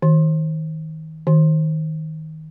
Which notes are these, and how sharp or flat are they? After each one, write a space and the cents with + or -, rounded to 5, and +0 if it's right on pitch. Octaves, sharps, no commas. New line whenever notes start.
D#3 +25
D#3 +15